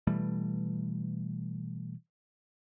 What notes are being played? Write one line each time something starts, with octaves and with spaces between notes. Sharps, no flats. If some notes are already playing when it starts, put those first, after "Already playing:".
B2 E3 G3 A3